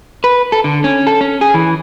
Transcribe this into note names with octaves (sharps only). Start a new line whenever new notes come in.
B4
A4
D3
C#4
A4
C#4
G#4
E3